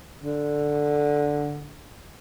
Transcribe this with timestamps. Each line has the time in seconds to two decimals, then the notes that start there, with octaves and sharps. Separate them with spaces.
0.21 D3